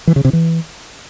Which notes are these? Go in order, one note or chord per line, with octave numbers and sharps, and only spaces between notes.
E3
C#3
C3
E3